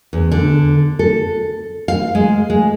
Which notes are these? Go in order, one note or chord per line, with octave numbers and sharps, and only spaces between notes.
E2
D3
A4
F5
G#3
G#3